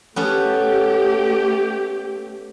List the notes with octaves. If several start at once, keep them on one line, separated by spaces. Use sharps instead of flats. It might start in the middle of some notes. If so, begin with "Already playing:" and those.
A3 B3 C#4 G4 A4